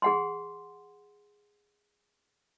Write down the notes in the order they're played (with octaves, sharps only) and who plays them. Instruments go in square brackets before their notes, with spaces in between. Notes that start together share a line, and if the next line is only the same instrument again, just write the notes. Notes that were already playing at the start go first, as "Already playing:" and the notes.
[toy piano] G#4 F#5 C6